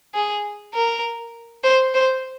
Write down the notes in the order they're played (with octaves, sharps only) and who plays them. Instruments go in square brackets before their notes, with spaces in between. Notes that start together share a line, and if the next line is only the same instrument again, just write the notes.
[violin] G#4
A#4
C5
C5